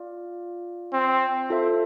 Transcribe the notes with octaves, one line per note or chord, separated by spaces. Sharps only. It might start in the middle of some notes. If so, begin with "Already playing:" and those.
Already playing: F4 D5 F5
C4
F4 A4 C5 E5